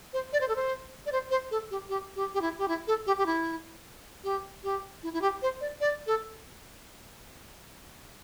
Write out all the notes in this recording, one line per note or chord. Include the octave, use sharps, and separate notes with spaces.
C5
D5
C5
A4
C5
D5
C5
C5
A4
G4
G4
G4
G4
E4
G4
E4
A4
G4
G4
E4
G4
G4
E4
E4
G4
C5
D5
D5
A4